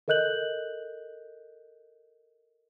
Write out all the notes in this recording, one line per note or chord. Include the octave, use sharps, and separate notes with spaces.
A4 A#4 D#5 F#6 G6 F#7